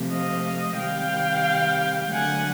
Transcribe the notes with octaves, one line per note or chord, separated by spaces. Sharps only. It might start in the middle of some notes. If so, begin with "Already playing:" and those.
Already playing: C3 F3 A3
D#5 F5
C3 D#3 G3 F5 G5
D3 F#3 A3 F#5 G#5